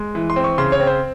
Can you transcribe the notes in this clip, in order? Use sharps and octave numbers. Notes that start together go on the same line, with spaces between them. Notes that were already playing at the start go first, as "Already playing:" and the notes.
Already playing: G#3
E3
C6
C4
C#6
C#3 C6
C#5
C4
C5